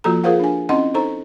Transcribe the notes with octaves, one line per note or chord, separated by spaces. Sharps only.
F3 A#3 F4 F#4 A4 A#5
F4 G#4 A#4 C5 F5 F#5
D4 G#5
C4 C#4 E4 D#5 F#5 C6
D#4 A4 C5 A#5